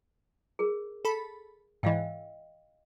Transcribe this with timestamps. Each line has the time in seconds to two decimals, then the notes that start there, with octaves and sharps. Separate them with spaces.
0.59 G#4 A#4
1.05 A4 B5
1.83 G#2 E3 D#5 F5 G5